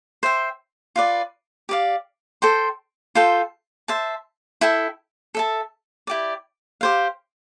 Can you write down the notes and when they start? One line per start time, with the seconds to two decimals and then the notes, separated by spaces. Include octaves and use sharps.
0.23 C5 E5 G5
0.96 F4 B4 D5
1.69 G4 D5 F5
2.42 A4 C5 G5 C6
3.15 F4 A4 C5 G5
3.88 C5 E5 A5
4.61 E4 A4 E5 G5
5.35 A4 E5 A5
6.07 E4 G4 D5
6.81 G4 C5 F5